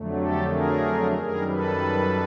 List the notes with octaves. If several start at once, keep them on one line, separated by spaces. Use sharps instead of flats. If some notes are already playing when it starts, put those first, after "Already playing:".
Already playing: F2 D3 F#3 A3
G4 A4
G#4 A#4
F#2 D#3 G3 G#4 A#4
A4 B4